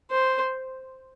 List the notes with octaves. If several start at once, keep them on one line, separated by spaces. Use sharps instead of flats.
C5